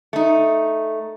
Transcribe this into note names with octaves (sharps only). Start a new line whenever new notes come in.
A3 D#4